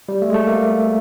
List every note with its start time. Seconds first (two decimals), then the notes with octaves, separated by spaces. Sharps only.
0.09 G3
0.22 A3
0.30 G#3
0.34 A3
0.47 A#3